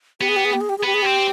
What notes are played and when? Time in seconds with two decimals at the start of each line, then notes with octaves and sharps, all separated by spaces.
0.20 B3 G4
0.29 G#4
0.36 G4
0.45 G#4
0.53 G4
0.61 G#4
0.69 G4
0.78 G#4
0.83 B3 G4
0.94 G#4
1.02 C4 G4